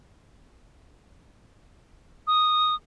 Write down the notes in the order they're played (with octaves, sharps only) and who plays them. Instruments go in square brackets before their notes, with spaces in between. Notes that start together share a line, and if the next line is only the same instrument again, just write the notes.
[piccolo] D#6